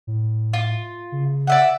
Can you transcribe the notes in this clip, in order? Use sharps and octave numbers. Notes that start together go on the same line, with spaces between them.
A2
F4
C#3
D5 E5 F#5